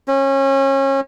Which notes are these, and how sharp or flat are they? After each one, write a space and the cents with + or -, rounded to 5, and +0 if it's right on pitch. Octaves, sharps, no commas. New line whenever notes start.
C#4 -30